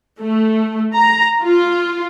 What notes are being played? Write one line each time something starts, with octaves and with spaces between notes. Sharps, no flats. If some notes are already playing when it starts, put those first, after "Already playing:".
A3
A#5
F4